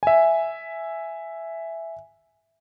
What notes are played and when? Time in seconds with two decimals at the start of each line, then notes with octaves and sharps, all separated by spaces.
0.03 E5 G#5